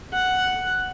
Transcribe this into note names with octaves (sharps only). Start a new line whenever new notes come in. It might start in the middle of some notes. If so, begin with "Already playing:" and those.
F#5